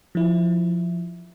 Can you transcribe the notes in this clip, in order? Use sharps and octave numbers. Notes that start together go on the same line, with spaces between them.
F3 E4